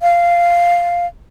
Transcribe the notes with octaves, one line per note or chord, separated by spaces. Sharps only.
F5